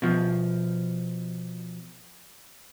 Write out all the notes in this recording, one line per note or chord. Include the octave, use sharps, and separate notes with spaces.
B2 F3